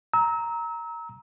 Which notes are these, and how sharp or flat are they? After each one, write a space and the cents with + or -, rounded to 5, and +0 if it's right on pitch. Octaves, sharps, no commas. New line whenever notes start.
A#5 +0 E6 -35